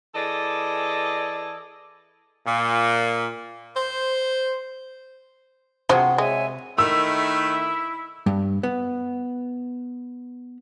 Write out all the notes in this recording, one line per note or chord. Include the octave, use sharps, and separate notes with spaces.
E3 G#4 A4 D5 D#5
A#2
C5
C3 F3 F#3 C4 F#4 G#4 C5
G#3 C#5 E5 G#5
D#3 A3 E4 E5 E6
G2
B3